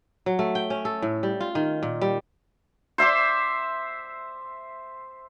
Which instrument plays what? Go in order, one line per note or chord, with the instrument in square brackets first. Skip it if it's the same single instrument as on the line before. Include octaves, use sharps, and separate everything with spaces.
[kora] F#3
A3
G5
C#4
A4
A2
G3
F4
D#3
A#2
G3
[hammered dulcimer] C5 E5 C6 D6